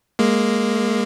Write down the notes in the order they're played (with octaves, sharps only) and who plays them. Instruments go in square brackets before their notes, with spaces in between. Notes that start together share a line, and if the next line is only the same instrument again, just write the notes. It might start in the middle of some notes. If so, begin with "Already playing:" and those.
[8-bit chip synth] G#3 A#3